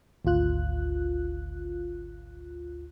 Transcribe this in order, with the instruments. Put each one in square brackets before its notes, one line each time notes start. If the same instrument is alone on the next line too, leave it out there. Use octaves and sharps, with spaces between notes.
[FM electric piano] G#1 D2 F4 F#6